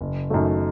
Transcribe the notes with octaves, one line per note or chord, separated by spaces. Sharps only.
F#1
F#2 D#3 F#3 A3